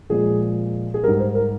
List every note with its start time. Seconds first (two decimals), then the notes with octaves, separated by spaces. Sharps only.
0.10 A#2 F3 G#3 G#4
0.94 G#4
1.03 G#2 G3 A#4
1.19 C5
1.35 A#4